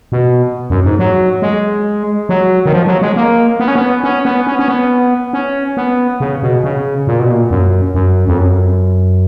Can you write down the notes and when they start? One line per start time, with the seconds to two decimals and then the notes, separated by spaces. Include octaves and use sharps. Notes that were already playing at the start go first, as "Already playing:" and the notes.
0.12 B2
0.70 F#2
0.85 G#2
0.99 F#3
1.42 G#3
2.29 F#3
2.66 D#3
2.73 F3
2.87 F#3
3.02 G#3
3.16 A#3
3.60 B3
3.68 C#4
3.75 B3
4.04 C#4
4.25 B3
4.47 C#4
4.59 C#4
4.68 B3
5.33 C#4
5.77 B3
6.20 C#3
6.43 B2
6.64 C#3
7.07 A#2
7.20 B2
7.31 A#2
7.51 F#2
7.94 F#2
8.28 F2
8.38 F#2